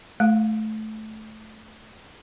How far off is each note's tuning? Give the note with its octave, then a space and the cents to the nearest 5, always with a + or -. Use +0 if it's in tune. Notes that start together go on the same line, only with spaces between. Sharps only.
A3 -15 F5 -10